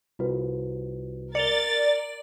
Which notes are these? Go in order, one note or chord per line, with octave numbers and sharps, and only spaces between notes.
C2 F4 F#4 B4
A#4 D5 A6 C#7 F7 G7